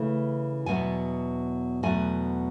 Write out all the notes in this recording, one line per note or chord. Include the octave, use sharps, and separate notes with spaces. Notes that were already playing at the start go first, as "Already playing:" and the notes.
Already playing: C#3 E3 A3 E4
E2 B2 F#3 B3 G#5
E2 B2 F#3 A3 G#5